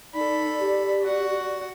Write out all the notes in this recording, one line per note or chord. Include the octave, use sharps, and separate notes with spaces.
D#4 A4 D5 B5
G4
F#4 F#5